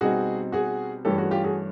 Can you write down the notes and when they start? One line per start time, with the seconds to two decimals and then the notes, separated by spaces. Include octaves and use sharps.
0.01 B2 G3 C4 D#4 F#4 G#4
0.52 F#4 G#4
1.05 G2 E3 A3 C#4 G4 A4
1.18 F#4 G#4
1.31 F4 G4
1.44 F#4 G#4